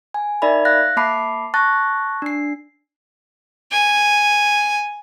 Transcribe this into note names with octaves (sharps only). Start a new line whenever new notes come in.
G#5
D#4 A#4 D5 E5 B5
F5 F#6 A6 A#6
A#3 E5 A5 B5 D6 C7
A5 C#6 F#6 A6 A#6
D4 C7
G#5